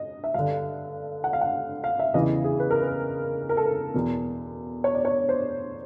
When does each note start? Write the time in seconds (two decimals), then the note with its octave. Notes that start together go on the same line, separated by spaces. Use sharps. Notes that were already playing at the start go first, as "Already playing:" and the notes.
Already playing: D#5
0.24 E5
0.34 G2 D3 F5
1.24 F#5
1.33 F5
1.41 F#5
1.84 F5
1.99 E5
2.14 E2 C#3 E3 D#5
2.44 G#4
2.60 B4
2.70 A#4
2.81 B4
3.49 A#4
3.57 A4
3.66 A#4
3.94 E2 B2
4.84 C#5
4.95 D5
5.05 C#5
5.29 C5